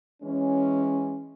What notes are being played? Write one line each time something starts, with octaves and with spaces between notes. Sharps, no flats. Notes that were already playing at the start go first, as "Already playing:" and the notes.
E3 G#3 C#4